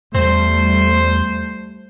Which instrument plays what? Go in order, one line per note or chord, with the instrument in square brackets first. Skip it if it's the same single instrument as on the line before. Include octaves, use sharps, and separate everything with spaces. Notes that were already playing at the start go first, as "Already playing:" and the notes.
[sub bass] E2 [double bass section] G3 A3 [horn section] C5